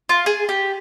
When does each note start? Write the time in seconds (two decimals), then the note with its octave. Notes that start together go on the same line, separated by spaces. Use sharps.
0.09 F4
0.26 G#4
0.49 G4